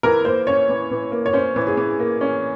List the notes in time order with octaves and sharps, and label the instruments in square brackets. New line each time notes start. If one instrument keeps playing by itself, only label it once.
[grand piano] E3 [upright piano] A#4
[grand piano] A#3 [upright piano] C5
[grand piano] C#4 [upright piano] C#5
[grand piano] E3
E3
A#3
[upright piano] C#5
[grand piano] C#4 [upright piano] C5
[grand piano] E3
[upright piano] G#4
[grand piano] E3
A#3
C#4